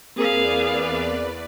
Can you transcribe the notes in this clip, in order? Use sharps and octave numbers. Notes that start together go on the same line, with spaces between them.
E2 A#3 C4 G#4 A#4 B4 D5 F5